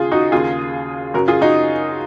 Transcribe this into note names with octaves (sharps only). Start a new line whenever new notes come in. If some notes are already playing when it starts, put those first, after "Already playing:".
Already playing: D#2 C#3 F4 G#4
D#4 F#4
D#2 C#3 F4 G#4
F#2 C#3 F#4 A#4
F4 G#4
D#4 F#4